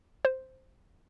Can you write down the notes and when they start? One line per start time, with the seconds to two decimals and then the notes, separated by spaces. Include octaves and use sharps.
0.25 C5